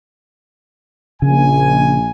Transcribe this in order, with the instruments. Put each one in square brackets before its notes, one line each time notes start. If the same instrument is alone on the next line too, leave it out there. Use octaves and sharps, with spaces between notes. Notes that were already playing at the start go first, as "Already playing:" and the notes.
[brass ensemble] A#1 G#5 [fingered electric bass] C#3